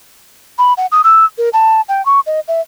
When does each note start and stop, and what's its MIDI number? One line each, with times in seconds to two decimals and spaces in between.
0.58 0.73 83
0.77 0.86 78
0.92 1.02 87
1.04 1.25 88
1.38 1.49 70
1.53 1.81 81
1.88 2.04 79
2.05 2.20 85
2.26 2.40 75
2.48 2.61 76